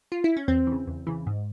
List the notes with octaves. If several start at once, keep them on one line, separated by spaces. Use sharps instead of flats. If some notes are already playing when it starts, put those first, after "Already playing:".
F4
E4
C#4
E2 C4
C#3 E3
E2
C#3 E3
G#2